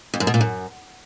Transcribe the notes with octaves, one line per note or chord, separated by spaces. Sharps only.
F2
F#2
B2
A#2
F#2